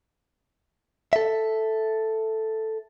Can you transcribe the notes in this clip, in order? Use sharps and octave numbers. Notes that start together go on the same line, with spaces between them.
A4 E5